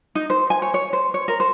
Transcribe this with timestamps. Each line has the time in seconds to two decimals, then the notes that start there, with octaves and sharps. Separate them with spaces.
0.15 D#4
0.30 C5
0.50 G#5
0.62 C#5
0.74 C#5
0.93 C5
1.14 C#5
1.28 A#4
1.40 C5